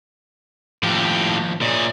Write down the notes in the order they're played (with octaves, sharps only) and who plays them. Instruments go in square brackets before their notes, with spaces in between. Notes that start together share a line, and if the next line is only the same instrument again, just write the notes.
[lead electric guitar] D#2 F3 [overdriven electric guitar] A2 G4
[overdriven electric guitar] A#2 G#4 [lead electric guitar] D5 D#5